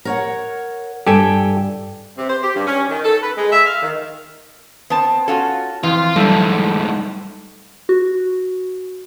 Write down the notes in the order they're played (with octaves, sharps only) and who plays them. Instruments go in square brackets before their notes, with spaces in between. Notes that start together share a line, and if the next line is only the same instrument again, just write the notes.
[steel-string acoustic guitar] A#4 C#5 F#5
[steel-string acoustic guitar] G2 G5 [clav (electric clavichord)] G4 A4 G#5
[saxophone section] C3
C5
G4
G2
C#4
D#3
A4
B4
G#3
E5
F5
D#3
[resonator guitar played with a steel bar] B3 C4 A5
[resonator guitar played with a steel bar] C#4 F4 F#4 [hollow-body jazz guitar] A4
[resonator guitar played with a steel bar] F2 [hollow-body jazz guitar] E3 [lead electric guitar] F4
[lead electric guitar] G#2 A3 [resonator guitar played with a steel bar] D3 A4 [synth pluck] F#3 G3
[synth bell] F#4